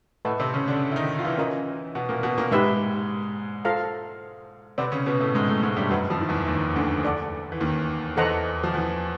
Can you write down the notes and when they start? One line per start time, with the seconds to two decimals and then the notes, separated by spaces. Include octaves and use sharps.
0.25 A2 A3 B4 D#5 F#5 A5 C#6
0.40 C3 C4
0.54 C#3 C#4
0.68 D3 D4
0.91 E4
0.96 D#3 D#4
1.19 F4
1.25 E3 E4
1.38 C#4 F4 A#4 D#5
1.95 B2 B3
2.09 A#2 A#3
2.23 B2 B3
2.38 A#2 A#3
2.51 G#2 G#3 D#4 G4 B4 E5
3.65 F4 A4 C5 F5 A#5
4.78 C3 C4 B4 D5 F#5
4.92 C#3 C#4
5.06 B2 B3
5.21 A2 A3
5.35 G#2 G#3
5.48 A2 A3
5.63 G#2 G#3
5.76 G2 G3
5.91 F#2 F#3 B4 D#5 F#5 A#5
6.10 F2 F3
6.21 D#3
6.29 E2 E3
6.47 D#2 D#3
6.75 D2 D3
7.04 A4 D5 F#5
7.52 E3
7.60 D#2 D#3
8.17 E2 E3 A4 C5 D#5 F#5 A#5
8.63 F3
8.73 E2 E3